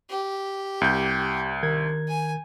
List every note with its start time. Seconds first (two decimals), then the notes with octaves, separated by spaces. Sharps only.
0.10 G4
0.81 C2 G6
1.63 D#3 A#4 G#6
2.08 G#5